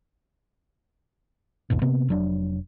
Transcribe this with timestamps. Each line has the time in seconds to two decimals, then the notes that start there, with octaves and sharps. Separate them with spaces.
1.70 G#1 D#2 G#2 B2
1.82 C3 A#3 B3
2.09 F1 F#3 D4